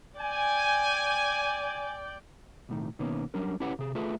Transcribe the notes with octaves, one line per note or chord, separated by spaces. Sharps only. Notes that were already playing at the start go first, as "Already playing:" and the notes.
D5 G5 G#5
B1 A2 D#3
B2 D#3 A#3 B3 C#4
F#3 G3 C#4 D4 A#4
C#4 E4 G4 B4 C#5 F#5
C3 G#4
A3 F4 G#4 A4 B4 E5